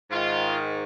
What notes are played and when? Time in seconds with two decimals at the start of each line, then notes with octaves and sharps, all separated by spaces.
0.10 G#2 D#3 F4